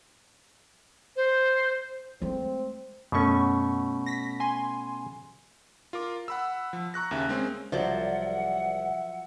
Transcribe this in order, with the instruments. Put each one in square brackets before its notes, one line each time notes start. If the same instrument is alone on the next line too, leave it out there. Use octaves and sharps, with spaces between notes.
[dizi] C5
[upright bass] G#3 A3 [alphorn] C4
[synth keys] F#2 C#6 [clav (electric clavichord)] B2 A3 C#4
[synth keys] A#6 B6
G#5 C6
[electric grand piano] F4 A#4 D6
F#5 B5 E6
F3
A#5 C#6 F#6 A#6
D#2 C#3 C#4 E5
G#3 A#3 C4 C#4
[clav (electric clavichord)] C2 C5 [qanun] F3 F#3 D5 [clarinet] E5 [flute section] F#5